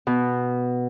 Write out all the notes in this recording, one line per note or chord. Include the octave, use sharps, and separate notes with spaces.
B2